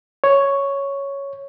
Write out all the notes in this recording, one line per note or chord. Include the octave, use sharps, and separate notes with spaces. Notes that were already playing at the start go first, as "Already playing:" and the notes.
C#5